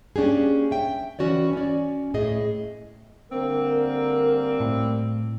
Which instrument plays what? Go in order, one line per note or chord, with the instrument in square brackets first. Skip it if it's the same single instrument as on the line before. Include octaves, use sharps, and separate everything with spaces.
[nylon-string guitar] A#3 C#4 D4 G4 G#4
E5 G5
E3 C#4 F#4 C#5 D5
C#4 D5
A2 A3 G#4 D#5
[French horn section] D3 A#4 [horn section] G3 A#3 C4
[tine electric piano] A2